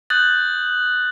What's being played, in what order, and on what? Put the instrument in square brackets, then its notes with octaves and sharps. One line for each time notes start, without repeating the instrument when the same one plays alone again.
[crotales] D#6 F#6 G6 A6 F#7